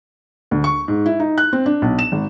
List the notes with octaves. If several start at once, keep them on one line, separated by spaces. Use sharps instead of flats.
D2
C#6
G#2
E4
D#4
F#6
C4
D4
B1
E7
G#1